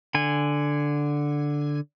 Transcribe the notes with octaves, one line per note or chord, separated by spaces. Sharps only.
D3 G#5